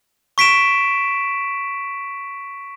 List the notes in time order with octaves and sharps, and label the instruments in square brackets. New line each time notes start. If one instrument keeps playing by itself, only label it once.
[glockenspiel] C#6 B6 D7 E7